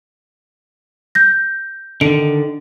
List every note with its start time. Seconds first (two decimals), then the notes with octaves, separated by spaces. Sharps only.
1.15 G6 A#6
2.01 D3 D#3 D7